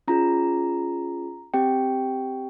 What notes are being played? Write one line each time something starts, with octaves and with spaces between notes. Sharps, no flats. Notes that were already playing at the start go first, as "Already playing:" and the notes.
C#4 F4 G#4 A#5
C4 G4 G5